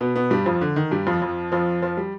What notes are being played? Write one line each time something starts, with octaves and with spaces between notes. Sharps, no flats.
B2 B3
B2 B3
G2 G3
F2 F3
D3
D#3
G2 G3
F2 F3
F2 F3
F2 F3
F2 F3
G3